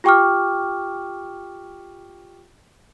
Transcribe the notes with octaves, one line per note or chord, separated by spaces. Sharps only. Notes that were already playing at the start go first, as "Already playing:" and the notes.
F4 G4 G5 C#6 D6 F6